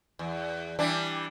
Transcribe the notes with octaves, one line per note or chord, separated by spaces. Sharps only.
E2
E3 G3 D4